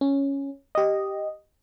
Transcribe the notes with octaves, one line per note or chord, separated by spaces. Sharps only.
C#4
G4 D#5